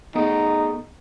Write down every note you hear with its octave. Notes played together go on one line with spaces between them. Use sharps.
B3 D#4 G#4 A4